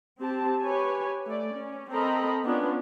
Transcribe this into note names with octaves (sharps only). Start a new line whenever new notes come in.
C4 G4 A5
G4 B4 C#5 G#5
A3 D5
C#4
C4 A4 A#4 D#5 A#5 B5
B3 C#4 D4 F4